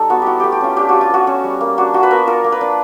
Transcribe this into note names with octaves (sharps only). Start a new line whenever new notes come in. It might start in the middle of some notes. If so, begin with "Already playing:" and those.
Already playing: G3 D#4 A4
B3 F#4
E4 F#4 G4
A3 G4
G4
C#4 F4
D4 G4
F4 F#4
F4
B3 F#4
C#4
G3
A#3
D4 F#4
F4 F#4
B4
B3 A#4
F4 A#4
A#3
B4
D4